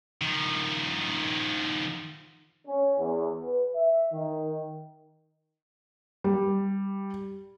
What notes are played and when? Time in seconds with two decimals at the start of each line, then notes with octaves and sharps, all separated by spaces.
0.22 D#3 F3
2.66 C#4
2.98 E2
3.44 B4
3.76 E5
4.13 D#3
6.24 G3